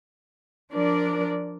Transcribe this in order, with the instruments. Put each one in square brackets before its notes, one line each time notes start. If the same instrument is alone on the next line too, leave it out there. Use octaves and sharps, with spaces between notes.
[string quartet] F3 D4 A#4 D5